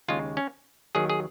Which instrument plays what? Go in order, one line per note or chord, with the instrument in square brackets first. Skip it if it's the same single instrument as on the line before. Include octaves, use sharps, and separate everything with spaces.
[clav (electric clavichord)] D#2 C#3 G#3 F4
C#4
D#2 D#3 F#3 G#4
G#4